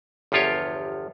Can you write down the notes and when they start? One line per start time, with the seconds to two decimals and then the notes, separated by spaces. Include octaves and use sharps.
0.32 G1 E2 F3 F4 G4 C#5